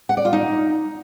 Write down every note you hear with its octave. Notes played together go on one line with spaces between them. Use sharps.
F#5
D5
F4
D#4